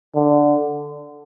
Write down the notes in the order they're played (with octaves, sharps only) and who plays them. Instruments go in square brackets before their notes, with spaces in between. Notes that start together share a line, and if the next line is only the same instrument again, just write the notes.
[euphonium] D3